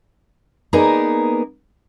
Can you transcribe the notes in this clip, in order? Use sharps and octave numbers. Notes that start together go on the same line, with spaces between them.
A#3 B3 D#4 G#4 A#4 D5